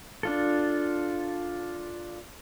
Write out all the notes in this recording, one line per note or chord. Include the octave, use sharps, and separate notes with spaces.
D4 F4 A4